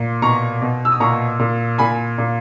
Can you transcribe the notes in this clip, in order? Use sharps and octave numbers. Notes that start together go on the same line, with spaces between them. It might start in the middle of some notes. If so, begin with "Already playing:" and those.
Already playing: A#2
B2 A#5 C#6
B2
E6
D#6
A#2 A#5 C#6
A#2
A#2 G#5 B5
A#2